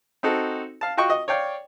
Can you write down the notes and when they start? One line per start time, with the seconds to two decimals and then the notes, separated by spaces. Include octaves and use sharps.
0.23 C4 D#4 F#4 A4
0.81 F5 A5
0.97 F4 F#4 D#5 G5 C#6
1.10 D#5
1.28 C#5 D5 F5 G5